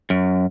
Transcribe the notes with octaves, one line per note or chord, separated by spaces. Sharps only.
F#2